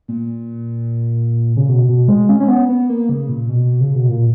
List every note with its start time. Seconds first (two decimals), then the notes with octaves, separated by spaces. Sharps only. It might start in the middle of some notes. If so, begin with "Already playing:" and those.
0.08 A#2
1.57 C#3
1.69 B2
1.89 B2
2.08 G#3
2.29 C#4
2.40 C#4
2.48 B3
2.69 B3
2.89 A#3
3.09 C#3
3.29 A#2
3.49 B2
3.81 C#3
3.95 B2
4.09 A#2